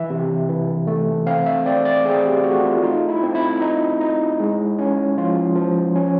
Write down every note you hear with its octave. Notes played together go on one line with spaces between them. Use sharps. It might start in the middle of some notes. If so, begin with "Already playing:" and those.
Already playing: E3 E5
C3
E3
A3
C4 F5
E5
C4 D5
D5
C4 G#4
G4
A3 F#4
F4
D#4 F4
E4
C4
E4
D#4
D#4
G#3
C#4
F3 F4
F3
C#4